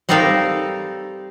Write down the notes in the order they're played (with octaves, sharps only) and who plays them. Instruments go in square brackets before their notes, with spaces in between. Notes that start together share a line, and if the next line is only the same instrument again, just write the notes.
[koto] G3 C4 D#4 A4 A#4 F5